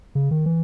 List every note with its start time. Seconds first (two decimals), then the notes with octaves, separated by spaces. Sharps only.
0.15 C#3
0.31 D#3
0.46 E3